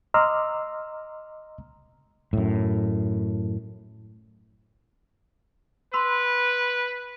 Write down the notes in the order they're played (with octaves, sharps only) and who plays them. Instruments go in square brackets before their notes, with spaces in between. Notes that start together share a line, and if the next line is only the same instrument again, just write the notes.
[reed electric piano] D#5 A#5 C6 D6 E6 F6
[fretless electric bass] F#2 A2
[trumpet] B4 [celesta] B5 C6 E6